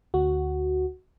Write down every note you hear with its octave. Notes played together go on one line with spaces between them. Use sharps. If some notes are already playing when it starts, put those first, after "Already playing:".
D2 F#4